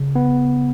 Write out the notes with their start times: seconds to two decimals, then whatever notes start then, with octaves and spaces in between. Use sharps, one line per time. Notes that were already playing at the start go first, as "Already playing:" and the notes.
Already playing: C#3
0.15 B3